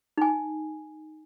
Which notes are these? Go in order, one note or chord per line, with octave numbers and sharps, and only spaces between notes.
D#4 G#5